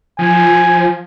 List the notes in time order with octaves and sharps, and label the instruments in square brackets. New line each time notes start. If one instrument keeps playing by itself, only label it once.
[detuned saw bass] F3 [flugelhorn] G#5